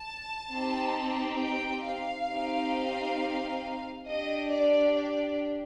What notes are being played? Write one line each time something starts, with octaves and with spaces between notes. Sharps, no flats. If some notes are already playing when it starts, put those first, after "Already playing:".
Already playing: A5
C4 D#4 G4
G5
F5
C4 D#4 G4
D4 G4 D#5
D5
D5